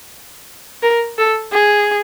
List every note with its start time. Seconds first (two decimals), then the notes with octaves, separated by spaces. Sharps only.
0.83 A#4
1.18 A4
1.52 G#4